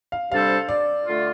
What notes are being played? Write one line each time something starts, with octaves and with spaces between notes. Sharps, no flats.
F5
C3 G3 D4 A4 C5 F5
D5
D3 A3 F4